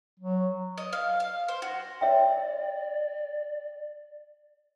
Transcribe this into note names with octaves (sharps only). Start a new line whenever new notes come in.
F#3
D#5
F5
F5
C5
F#4
C#5 D5 E5 G5